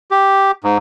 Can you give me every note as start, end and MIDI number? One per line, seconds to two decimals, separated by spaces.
0.11 0.51 67
0.64 0.77 44